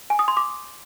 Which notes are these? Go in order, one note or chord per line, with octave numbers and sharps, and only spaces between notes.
G#5
D#6
C6
D6